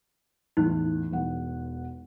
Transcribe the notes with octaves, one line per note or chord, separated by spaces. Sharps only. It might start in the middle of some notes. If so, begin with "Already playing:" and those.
A1 E2 D#4 F#6
E1 E2 F#5